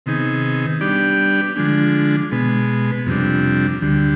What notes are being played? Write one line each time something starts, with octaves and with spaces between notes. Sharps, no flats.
C3 D#3 B3 D#4 G#4
G3 B3 D4 G4 D5
D3 F3 G#3 D4
B2 G#3 B3
F2 C3 G3 D4
D2 D3 G3